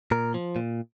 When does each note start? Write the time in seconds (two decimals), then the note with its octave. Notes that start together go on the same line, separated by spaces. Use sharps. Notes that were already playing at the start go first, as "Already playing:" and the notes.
0.11 A#2 A#4
0.34 F3
0.56 A#2